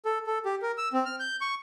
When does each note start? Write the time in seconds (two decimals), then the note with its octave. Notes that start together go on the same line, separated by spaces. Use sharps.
0.05 A4
0.27 A4
0.45 G4
0.62 A#4
0.78 E6
0.93 C4
1.06 F6
1.20 G6
1.41 C#6